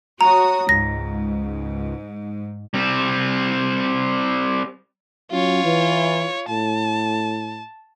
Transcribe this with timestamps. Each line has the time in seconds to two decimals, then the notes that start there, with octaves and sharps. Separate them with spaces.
0.21 F#4 C#5 A#5 D#6
0.69 C#2 G#2 A#6
2.74 G3 C4
5.32 F#3 C#4 F4 C#5
5.65 E3
6.49 A2 A5